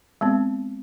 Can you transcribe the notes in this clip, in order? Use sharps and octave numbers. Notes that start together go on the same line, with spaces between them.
G#3 B3 C4